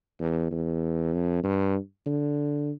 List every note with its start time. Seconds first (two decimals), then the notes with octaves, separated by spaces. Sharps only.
0.20 E2
0.51 E2
1.14 F2
1.44 G2
2.06 D3